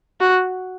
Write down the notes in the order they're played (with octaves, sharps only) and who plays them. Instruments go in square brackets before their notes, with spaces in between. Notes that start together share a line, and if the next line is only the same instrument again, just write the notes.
[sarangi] F#4